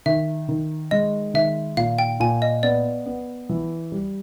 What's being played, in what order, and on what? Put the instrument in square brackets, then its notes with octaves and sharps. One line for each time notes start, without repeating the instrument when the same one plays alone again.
[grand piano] D#3 [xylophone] E5
[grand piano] D#3
[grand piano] G#3 [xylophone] D#5
[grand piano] D#3 [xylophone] E5
[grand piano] A#2 [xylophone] F5
[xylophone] G5
[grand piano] A#2 [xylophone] G#5
[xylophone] D#5
[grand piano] B3 [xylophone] D5
[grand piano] B3
E3
G3